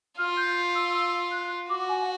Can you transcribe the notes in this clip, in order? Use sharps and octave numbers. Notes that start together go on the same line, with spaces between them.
F4 F6
G6
E6
E6
F#6
F#4 D6
G#5
F#5